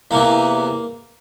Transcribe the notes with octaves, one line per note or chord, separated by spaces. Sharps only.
E2 C3 E3 A#3